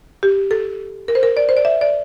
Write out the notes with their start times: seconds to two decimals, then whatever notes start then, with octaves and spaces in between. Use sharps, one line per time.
0.23 G4
0.51 A4
1.08 A#4
1.15 C5
1.23 A#4
1.37 D5
1.49 C5
1.57 D5
1.65 E5
1.81 D5